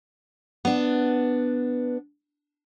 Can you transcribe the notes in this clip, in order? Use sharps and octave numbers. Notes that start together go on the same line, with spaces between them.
B3 D4